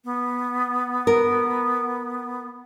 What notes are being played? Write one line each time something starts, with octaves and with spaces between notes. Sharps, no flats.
B3
A#4